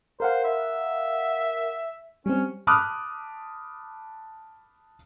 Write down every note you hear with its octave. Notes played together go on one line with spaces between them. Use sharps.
A#4 C5 F5 F#5
E5
G3 C4 C#4
A5 B5 D6 D#6 F6 F#6